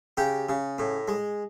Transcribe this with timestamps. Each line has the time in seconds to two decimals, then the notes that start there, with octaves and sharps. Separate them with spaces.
0.17 C#3 G4
0.49 C#3
0.79 A2
1.08 G#3